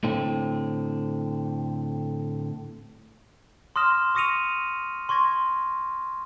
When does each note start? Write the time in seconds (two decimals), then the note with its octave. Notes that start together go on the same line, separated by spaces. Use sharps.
0.04 A2 D3 C4
3.76 C6 D6 D#6 F6 A#6 E7
4.15 C#6 D#6 A#6 C#7 D#7 F7
5.09 C6 C#6 G#6 A#6